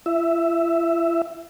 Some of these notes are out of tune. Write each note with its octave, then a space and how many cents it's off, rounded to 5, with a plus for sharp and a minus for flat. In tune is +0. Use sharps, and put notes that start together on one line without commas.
E4 +45 E5 +5